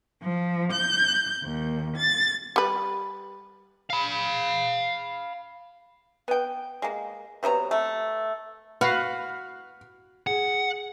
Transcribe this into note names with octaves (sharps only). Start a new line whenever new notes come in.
F3
G6
D#2
A6
G3 B4
F5 B5
B3 G5
G#3 A#3
C3 F#3 B3 A#5
A3
F#4 B4 F5 F6
G#4 F#5